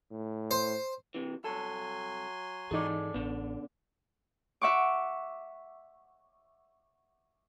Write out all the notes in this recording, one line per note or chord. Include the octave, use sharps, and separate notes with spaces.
A2
C5
C3 E3
C2 F#3 A4 G#5 C6
G#2 E3 D#4 G#4 A4 D5
A1 C#3 B3 D4
E5 F#5 C#6 D6